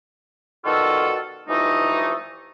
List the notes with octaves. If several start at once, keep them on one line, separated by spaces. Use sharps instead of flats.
B2 D#3 G3 F4 F#4 A4
G2 E3 F3 A3 D#4